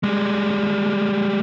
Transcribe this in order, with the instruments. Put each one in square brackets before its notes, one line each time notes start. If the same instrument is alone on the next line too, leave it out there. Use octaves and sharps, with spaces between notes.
[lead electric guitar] G3 G#3